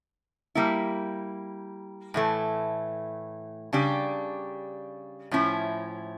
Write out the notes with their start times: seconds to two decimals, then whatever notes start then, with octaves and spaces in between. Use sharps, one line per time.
0.55 G3 A#3 E4
2.14 A2 E3 A3
3.73 C#3 G3 D4 G4
5.31 A2 F3 C#4 E4